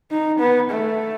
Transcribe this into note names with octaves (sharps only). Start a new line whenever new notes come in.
D#4
B3
A3